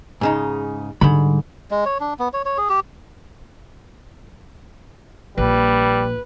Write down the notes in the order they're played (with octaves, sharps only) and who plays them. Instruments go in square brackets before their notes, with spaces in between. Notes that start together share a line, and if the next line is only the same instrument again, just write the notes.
[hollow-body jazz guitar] G#2 C#3 D#4
[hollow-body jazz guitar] G#2 B5 [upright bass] D3 G3
[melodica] G#3
C#5
D4
B3
C#5
C#5
G#4
G4
[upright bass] A#1 [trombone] G3 [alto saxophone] B4